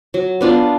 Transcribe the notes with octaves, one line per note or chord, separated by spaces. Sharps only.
F#3
B3 D4 F4